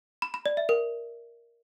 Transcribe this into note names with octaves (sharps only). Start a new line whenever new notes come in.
B5
B5
D5
E5
A#4